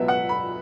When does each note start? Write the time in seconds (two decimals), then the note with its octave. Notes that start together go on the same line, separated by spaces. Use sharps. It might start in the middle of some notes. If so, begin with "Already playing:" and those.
Already playing: C#2 B2 F#3 B3 E5
0.08 F#5
0.29 B5